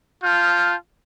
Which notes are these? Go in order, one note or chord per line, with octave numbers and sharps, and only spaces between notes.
F4 A5 F6 G6